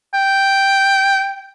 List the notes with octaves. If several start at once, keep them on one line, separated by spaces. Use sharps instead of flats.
G5